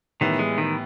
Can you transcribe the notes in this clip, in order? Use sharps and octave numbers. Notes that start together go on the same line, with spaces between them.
A2 D#3 E3 G3 B3
G#3
D#3